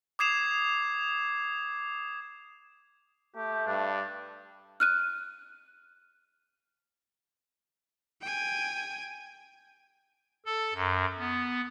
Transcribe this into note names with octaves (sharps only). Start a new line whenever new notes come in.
D6 D#6 G#6 C7 E7 F7
A3 G4
G2 D4
F6 F#6 D#7
G5 G#5
A4
F#2
B3